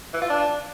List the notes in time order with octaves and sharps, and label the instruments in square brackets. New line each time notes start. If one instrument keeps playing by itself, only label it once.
[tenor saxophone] E3
F4
D4